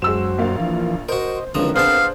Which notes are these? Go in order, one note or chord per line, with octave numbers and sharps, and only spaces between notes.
F#2 G#3 F#4 C5 E6 E7
A#1 A#3 F5
E3 F3
F#4 A#4 C5 D#5
C#2 D3 E3 F3 C4 A#4 A#5
B3 D4 G#4 C5 F5 A5